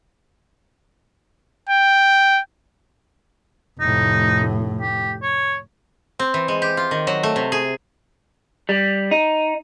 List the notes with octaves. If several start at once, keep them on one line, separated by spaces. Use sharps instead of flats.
G5
F1 A2 D#4
G4
C#5
C4
E3
G#3
G4
F4
D#3
F#3
A3
C3
G#4
G3
D#4